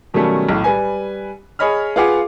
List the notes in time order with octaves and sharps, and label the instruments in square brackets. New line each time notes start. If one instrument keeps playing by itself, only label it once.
[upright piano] B2 D#3 F#3 G3 A3 C#4
B1 A2
G3 B4 G#5
G#4 C#5 D#5 B5 F6
F4 G#4 B4 F5 F#5 D6